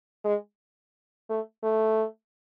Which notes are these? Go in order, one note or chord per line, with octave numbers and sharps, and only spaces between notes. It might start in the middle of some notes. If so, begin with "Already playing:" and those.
G#3
A3
A3